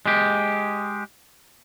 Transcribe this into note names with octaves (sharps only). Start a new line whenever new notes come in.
G#3 G4